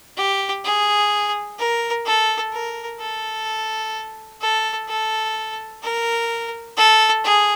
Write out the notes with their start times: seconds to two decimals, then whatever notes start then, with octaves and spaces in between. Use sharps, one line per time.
0.17 G4
0.64 G#4
1.59 A#4
2.06 A4
2.53 A#4
3.00 A4
4.41 A4
4.88 A4
5.83 A#4
6.77 A4
7.24 G#4